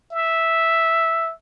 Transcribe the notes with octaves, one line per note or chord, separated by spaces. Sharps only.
E5